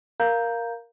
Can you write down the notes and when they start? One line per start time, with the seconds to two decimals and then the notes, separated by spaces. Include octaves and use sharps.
0.20 A#4 F5 A#5 G6